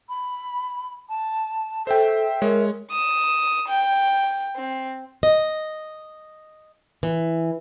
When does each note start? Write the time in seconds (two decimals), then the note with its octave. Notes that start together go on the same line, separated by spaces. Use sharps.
0.09 B5
1.09 A5
1.87 A4 C5 E5 G5
2.42 G#3 A#4 C#5
2.90 D#6 E7
3.68 G5
4.56 C4
5.23 D#5
7.03 E3